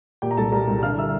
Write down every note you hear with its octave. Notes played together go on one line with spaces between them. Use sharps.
A#2 G4 G5
A#5
C2 A4 A5
G3 A#4 A#5
C2
D3 F5 F6
E5 E6